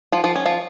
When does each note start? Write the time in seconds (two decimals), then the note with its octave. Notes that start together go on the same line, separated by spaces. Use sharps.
0.12 F3 F4
0.24 F3 F4
0.36 C#4
0.46 F3 F4